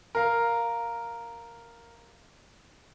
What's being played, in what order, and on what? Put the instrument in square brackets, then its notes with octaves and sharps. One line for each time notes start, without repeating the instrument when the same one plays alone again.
[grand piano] A#4 F5